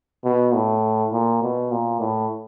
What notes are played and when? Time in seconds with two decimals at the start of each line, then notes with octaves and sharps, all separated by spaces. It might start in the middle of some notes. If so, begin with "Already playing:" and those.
0.25 B2
0.54 A2
1.13 A#2
1.42 B2
1.71 A#2
2.00 A2